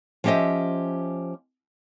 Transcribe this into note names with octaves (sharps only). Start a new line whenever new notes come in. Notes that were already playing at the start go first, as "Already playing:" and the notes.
F3 C#4 G4 C5 D#5 E5